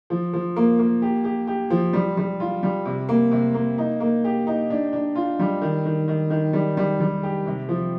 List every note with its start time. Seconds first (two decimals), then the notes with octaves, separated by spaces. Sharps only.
0.10 F3
0.33 F3
0.56 A#3
0.79 A#3
1.02 G4
1.24 G4
1.47 G4
1.70 F3
1.93 G3
2.17 G3
2.40 F4
2.63 G3
2.85 C3
3.09 A#3
3.31 C3
3.54 A#3
3.78 D#4
4.00 A#3
4.24 G4
4.47 D#4
4.70 D4
4.93 D4
5.15 F4
5.39 G3
5.62 D#3
5.85 D#3
6.08 D#3
6.30 D#3
6.53 G3
6.77 G3
7.00 G3
7.23 G4
7.46 C3
7.69 F3